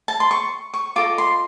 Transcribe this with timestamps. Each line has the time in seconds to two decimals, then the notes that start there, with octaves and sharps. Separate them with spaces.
0.08 A5
0.20 C6
0.31 C#6
0.74 C#6
0.96 F4 A4 D#5 D6
1.18 C6